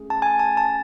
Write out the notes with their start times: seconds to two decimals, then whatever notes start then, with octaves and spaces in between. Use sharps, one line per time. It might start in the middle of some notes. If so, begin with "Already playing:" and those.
Already playing: A3 C#4 G#4
0.10 A5
0.22 G#5
0.39 A5
0.57 A5